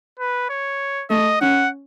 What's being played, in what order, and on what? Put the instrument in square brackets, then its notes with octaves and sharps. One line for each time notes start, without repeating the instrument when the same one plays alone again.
[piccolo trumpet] B4
C#5
[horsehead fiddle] A3 [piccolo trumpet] D#5
[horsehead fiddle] C#4 [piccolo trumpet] F#5